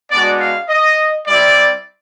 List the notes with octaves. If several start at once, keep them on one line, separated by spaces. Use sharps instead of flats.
G#3 B3 D4 F#4 D5
F5
D#5
G3 C4 E4 G4 D5